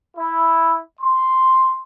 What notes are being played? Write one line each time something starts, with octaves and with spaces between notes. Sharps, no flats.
E4
C6